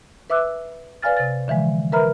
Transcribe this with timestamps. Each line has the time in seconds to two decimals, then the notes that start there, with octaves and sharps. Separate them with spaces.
0.30 B4 E5 D6 E6 F#6
1.02 B4 D5 F5 G#5 F6 A6
1.17 C3 A6
1.48 D3 E3 F3 G#3
1.92 A#4 B4 E5 A#5 B5 F6